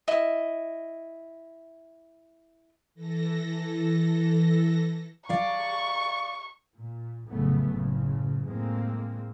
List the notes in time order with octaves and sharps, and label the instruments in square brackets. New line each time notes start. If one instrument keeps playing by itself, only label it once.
[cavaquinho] E4 D#5
[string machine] E3 A4 A#6
[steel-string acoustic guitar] D5 F5 [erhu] C#6
[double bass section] A#2
F1 A2 C#3 F#3 A3 B3
F#1 A2 C#3
A2 G#3 A#3 C4